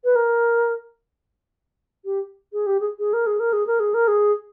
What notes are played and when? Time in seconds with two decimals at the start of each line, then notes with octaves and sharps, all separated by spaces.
0.04 B4
0.16 A#4
2.05 G4
2.53 G#4
2.66 G4
2.80 G#4
2.99 G#4
3.13 A#4
3.27 G#4
3.40 A#4
3.53 G#4
3.67 A#4
3.80 G#4
3.94 A#4
4.08 G#4